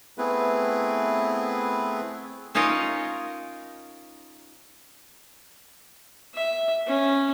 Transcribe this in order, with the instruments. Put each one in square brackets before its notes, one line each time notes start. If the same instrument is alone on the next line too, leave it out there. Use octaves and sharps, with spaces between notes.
[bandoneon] A3 B3 C4 E4 G#4 B4
[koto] C#4 D#4 F4 A#4 C#5 D#5
[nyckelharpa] E5
C#4